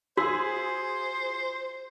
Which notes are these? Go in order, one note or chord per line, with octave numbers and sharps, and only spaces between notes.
F4 F#4 G#4 C5 E6